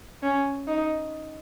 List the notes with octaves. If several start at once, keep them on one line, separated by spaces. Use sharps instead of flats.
C#4
D#4